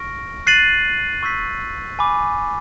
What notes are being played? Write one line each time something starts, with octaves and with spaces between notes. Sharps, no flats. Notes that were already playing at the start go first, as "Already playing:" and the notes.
Already playing: C#6 F6 A#6 D7
F#6 A6 C7 D#7 F#7
C#6 E6 G6 B6
G#5 B5 D6